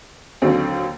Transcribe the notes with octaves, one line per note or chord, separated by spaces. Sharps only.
D#2 D3 F#3 C4